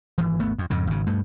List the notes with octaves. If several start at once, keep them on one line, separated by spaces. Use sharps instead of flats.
G#1 E3
G#1 A3 B3
F2
F2 G#2 C#3
G#1 C#3
G2 A3